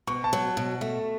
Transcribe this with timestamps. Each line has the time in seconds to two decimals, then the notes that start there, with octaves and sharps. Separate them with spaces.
0.07 B2 C#6
0.24 A5
0.33 F#3
0.57 B2
0.81 A3